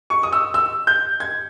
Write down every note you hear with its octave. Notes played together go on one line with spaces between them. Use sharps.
C#6
D#6
E6
E6
G6
G#6